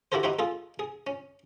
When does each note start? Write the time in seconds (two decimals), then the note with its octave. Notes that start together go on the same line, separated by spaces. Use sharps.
0.12 E4 F#4 G4 A4 A#4 C5
0.23 D#4 E4 F#4 G4 C5
0.39 F4 G#4 A4
0.79 G#4
1.07 C#4